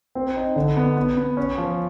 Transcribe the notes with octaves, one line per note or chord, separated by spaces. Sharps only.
C4
D#4
D3
B3
B3
B3
C#4
F3